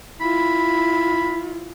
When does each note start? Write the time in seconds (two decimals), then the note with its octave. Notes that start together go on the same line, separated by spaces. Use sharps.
0.21 E4 F4 B5